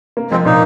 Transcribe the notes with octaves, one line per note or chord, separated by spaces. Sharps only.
A#3
F3 G#3 C4
A#2 A#3 D#4